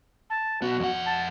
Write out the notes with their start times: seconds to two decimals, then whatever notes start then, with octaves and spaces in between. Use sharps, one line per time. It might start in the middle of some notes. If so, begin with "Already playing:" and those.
0.30 A5
0.62 B1 B3 F#4
0.80 F2 F#5
1.06 A5